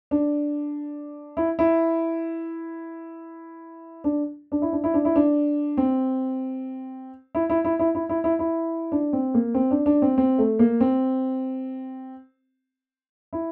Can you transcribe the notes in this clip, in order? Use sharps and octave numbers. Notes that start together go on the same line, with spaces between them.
D4
E4
E4
D4
D4
E4
D4
E4
D4
E4
D4
C4
E4
E4
E4
E4
E4
E4
E4
E4
D4
C4
A#3
C4
D4
D4
C4
C4
A3
A#3
C4
E4